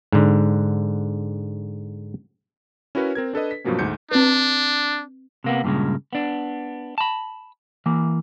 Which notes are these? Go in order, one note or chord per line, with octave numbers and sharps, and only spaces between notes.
G#2 D3
C#4 E4 F#4 A#4 B4 C#5
C4 A#4 G#6
D4 A4 B4 D#5
B6
G2 B2 F3 F#3 A#3 C#4
D2 G#2 G6 C#7
C4 D4 B4
C3 A#3 B3
G2 A#2 C#3 G#3
B3 D4
A5 B5
E3 A#3